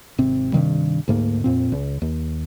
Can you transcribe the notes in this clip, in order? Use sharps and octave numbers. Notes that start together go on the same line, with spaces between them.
G#1 C3 C4
G2 C3 D#3 G3
D2 G#2 A#3
F2 A#2 C4
C#2
D#2